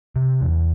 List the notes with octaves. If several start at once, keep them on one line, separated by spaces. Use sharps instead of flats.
C3
E2